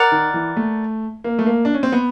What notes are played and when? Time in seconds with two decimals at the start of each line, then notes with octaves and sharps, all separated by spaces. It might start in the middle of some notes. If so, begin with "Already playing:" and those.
Already playing: A#4 D5 F#5
0.12 D#3
0.34 E3
0.57 A3
1.24 A#3
1.39 A3
1.46 A#3
1.65 D4
1.74 C#4
1.83 C4
1.92 B3